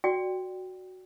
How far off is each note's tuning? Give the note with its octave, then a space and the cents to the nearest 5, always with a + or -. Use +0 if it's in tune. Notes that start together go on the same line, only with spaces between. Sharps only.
F#4 +0 D5 +0 G5 +0